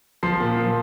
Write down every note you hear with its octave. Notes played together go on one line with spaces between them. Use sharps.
F3 C6 C7
A#2
F3